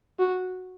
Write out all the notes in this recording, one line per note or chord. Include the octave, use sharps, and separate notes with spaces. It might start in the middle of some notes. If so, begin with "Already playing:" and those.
F#4